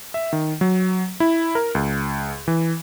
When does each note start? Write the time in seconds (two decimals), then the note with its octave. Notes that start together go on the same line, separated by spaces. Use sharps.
0.14 E5
0.33 D#3
0.61 F#3
1.20 E4
1.55 A#4
1.75 C#2
2.48 E3